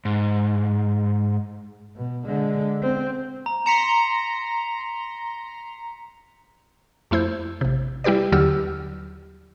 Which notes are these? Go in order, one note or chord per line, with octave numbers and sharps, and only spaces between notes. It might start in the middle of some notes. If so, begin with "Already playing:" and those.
G#2
B2
D3 G#3
C4
A#5
A#5 C6 B6 C#7 E7
F2 A3 E4 C5 G6
A1 C3
G3 E4 G4 B4 D5
D#2 D3 F#3 G4 E6 F6